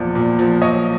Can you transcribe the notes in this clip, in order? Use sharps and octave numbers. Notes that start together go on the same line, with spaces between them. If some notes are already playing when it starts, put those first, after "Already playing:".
Already playing: E2 A#2 F3 D5
A#2
F3
F#3 C#5 D#5